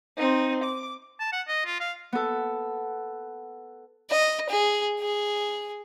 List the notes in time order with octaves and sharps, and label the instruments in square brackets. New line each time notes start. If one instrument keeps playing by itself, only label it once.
[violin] C4 D#4
D6
[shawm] A5
F#5
D#5
F4
F5
[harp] B3 A4
[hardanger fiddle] D#5
G#4
G#4